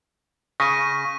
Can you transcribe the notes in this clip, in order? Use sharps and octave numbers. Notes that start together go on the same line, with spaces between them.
C#3 C#6 A#6 B6 D#7